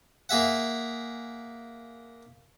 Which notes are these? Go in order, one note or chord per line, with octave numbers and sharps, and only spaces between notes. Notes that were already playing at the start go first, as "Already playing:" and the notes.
A#3 G#4 E5 F#5